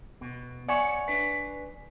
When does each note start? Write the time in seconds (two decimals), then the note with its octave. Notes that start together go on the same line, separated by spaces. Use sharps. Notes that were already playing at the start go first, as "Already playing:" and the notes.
0.21 B2
0.69 C#5 D5 E5 F#5 G#5 C#6
1.08 D4 B4